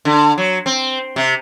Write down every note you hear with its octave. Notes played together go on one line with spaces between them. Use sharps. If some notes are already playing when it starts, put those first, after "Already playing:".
D3
F#3
C4
C3